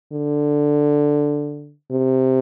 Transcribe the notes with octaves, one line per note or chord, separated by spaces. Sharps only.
D3
C3